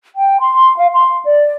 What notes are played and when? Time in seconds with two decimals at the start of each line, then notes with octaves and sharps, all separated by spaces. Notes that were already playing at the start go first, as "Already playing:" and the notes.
0.15 G5
0.40 C6
0.77 F5
0.93 C6
1.25 D5